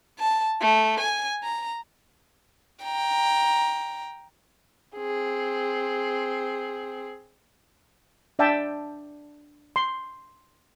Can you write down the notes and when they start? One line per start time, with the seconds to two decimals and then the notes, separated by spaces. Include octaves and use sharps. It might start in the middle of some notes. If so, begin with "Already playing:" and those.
0.19 A5
0.61 A3
1.01 G#5
1.43 A#5
2.84 G5 A#5
4.97 C4 G#4
8.39 D4 D5 E5 G5 A5
9.76 C6